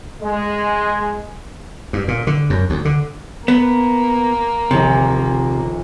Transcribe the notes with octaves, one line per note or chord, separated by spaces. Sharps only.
G#3
G2
A#2
D3
F#2
D2
D3
A#3 B3
D#1 A#1 C3